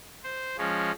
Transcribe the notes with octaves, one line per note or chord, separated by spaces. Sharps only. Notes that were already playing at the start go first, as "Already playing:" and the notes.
C5
F3 G#3 C#4